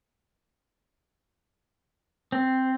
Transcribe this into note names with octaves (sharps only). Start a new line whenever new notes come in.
C4